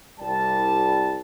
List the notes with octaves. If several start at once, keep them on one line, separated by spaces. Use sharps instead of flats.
C2 G3 A5